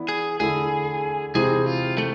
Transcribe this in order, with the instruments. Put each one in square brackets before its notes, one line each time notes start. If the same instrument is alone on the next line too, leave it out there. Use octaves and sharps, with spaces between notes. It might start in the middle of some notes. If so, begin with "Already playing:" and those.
Already playing: [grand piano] E3 B3 E4 D5
[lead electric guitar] G#4
[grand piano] D3 A3 E4 A4 [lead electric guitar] G#4
[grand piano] C3 E3 G#3 C4 E4 [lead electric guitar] G#4
[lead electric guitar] F4
A3